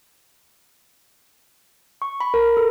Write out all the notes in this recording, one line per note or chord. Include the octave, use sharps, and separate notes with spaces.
C#6
B5
A#4
A4